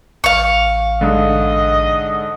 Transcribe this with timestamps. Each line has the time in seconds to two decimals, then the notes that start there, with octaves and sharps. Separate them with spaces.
0.24 A1 F5 C#6
1.01 G#2 D3 D#5